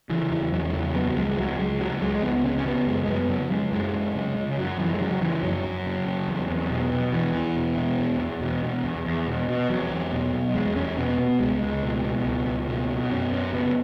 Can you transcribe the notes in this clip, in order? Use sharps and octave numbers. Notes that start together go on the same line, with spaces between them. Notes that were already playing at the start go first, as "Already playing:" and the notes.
C#3 E3
E2 E3
E2 F#3
C#3 F#3
C#3 B3
F#3
C#2 G#3
G#3
C#2 F#3
C#3 G#3
C#3 F#3
C#2 G#3
G#3
C#2 B3
C#3 C#4
C#4
C#3 B3
F#2 G#3
G#3
F#2 B3
C#3 F#3
C#3 G#3
F#2 G#3
F#2
C#3
C#3
F#2 F#3
F#2 E3
G#3
C#3 F#3
F#3
C#3 E3
F#2 F#3
F#2
C#3
C#3
E2
E2
B2
B2
E2 E3
E2
B2
B2
E2
E2
B2
B2
E2
E2
B2
B2
E2 F#3
E2
B2
B2
E2 G#3
E2 C#4
B2 B3
B2 B3
C#2 G#3
C#2
B2
B2
C#2
C#2
B2
B2
F#2 C#4
F#2 C#4
C#3 B3